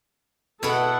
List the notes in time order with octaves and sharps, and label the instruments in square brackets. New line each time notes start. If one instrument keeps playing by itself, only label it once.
[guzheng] B2 E4 [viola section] A4 F#5